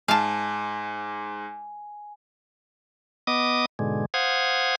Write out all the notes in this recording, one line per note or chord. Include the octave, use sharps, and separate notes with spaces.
G#2 F5 G#5 A5
B3 D#5 D6 D#6
G#2 B2 D3 G#3
C5 F5 F#5 D#6 G#6